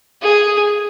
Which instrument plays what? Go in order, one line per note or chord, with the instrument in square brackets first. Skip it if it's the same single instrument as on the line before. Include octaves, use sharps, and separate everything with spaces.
[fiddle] G#4